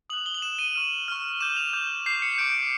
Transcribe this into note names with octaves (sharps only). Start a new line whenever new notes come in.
D#6 F#6 F7 F#7
G7
F#7
D#6 F#6 E7
D#7
C#6 F6
C#6 F6
D6 G6 E7
F7
D6 G6
D6 G6 C7
C#7
D6 G6 D7